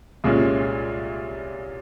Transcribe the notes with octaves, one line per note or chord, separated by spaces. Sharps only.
C2 A#2 G#3 C#4